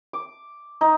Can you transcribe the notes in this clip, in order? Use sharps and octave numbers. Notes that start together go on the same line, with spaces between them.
D6
D#4